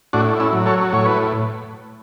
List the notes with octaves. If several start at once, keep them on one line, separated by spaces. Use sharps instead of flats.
A2 D4 F#4
C#4 E4
F#3
A4 C#5
A2 C#5
B4